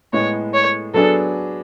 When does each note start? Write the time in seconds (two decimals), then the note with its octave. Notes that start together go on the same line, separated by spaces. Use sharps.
0.13 A2 G#3 B3 C#5
0.54 C#5
0.94 F#3 B3 D4 G#4 A4